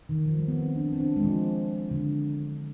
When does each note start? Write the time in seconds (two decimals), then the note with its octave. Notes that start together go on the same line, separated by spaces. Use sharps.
0.09 D#3
0.26 F3
0.37 G3
0.48 B3
0.58 C4
0.76 D4
0.92 C4
1.00 D4
1.16 G#3
1.24 F3
1.91 D3